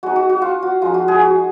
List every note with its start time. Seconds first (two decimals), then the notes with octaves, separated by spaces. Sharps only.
0.03 G#3 D#4 F#4
0.16 F#4
0.29 F#4
0.42 F4
0.62 F#4
0.82 F3 G#3 D#4 F4
0.94 F#4
1.08 G#3 G#4
1.21 F#4